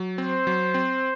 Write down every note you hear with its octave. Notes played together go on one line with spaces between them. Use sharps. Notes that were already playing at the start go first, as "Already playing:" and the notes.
Already playing: F#3
C4 C5
F#3
C4